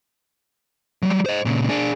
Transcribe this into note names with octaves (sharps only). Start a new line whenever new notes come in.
F#3 G3
C5 D#5
A#2 C#3
D4 G#4